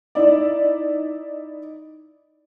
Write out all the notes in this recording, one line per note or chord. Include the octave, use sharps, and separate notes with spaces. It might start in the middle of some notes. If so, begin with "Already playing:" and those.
D#4 E4 D5